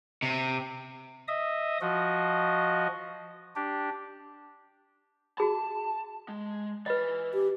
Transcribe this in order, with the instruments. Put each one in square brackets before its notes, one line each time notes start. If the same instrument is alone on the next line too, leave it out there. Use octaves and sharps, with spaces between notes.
[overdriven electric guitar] C3
[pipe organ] D#5 E5 D#6
F3 F#4 D#5
D4 G4
[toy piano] F#4 G#4 B5 [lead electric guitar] A5
[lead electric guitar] G#3
[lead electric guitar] E3 B5 [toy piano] B4 D#5
[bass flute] G4